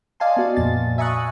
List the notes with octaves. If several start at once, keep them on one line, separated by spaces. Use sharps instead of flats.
D5 D#5 F5 G#5 A5 C6
B3 F#4 D5
F2 A#2 A6
E5 G#5 A#5 C#6 D#6 F#6